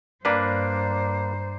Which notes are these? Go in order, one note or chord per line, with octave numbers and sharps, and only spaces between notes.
G2 A#3 D4 B4 C5 D5 A#5 B5